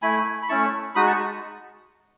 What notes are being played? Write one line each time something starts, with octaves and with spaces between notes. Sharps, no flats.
A3 E4 G#5 B5
B5
A3 C#4 E4 A5 C#6
G#3 D#4 F#4 B5 D#6
A5 C#6